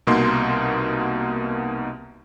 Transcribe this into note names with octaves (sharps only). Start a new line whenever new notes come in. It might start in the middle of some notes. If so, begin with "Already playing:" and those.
C2 B2 A#3 D#4 C6